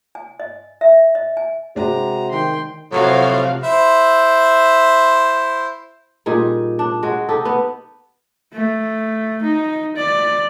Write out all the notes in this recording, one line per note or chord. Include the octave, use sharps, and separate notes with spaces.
G#5
D#5
E5
D#5
G#5
C3 G#3 D4 F#4 A#5
D#3 G5 C6
A2 C3 F3 F#3 F#4 F5
E4 C5 E5
A#2 G3 D#4 G#4
D4
G#3 F#4
D#4 G4 A4
B3
A3
D#4
D5